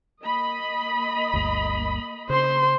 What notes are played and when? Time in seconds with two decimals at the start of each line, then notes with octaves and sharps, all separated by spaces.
0.23 A#3 D#5 B5
1.33 G1 D2 G2
2.30 C#3 C5 C6